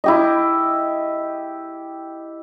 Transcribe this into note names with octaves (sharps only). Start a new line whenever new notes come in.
E4 G4 D#5